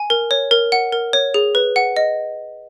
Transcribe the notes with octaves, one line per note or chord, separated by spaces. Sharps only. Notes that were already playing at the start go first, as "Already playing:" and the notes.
Already playing: G#5
A#4
C#5
A#4
F#5
A#4
C#5
G#4
B4
F#5
D#5